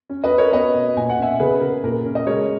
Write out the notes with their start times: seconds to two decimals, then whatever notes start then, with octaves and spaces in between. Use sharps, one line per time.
0.10 C#4
0.24 B4 D#5
0.31 C#4
0.38 A#4 C#5
0.52 B3 B4 D#5
0.74 B2
0.97 A#2 G#5
1.09 F#5
1.18 C#4 E5 G#5
1.39 C#3 G#4 B4
1.61 C#3 A#4
1.83 A#2 A#4
2.05 C#4
2.15 D#5
2.27 G#3 A#4 C#5